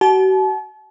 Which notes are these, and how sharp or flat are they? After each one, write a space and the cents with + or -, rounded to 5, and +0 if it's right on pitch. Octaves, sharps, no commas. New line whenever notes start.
F#4 +40 A5 -40